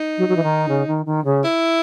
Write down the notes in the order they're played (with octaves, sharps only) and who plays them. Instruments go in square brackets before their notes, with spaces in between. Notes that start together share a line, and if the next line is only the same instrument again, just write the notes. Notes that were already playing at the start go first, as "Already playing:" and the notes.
Already playing: [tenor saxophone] D#4
[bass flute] F#3
F#3
E3
D#3
C#3
D#3
D#3
C#3
[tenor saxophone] E4